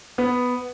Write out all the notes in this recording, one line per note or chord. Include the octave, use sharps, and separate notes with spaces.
B3